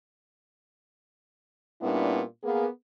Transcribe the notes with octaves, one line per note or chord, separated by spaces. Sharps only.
A#2 G3 B3 C#4 D4 E4
A#3 B3 G#4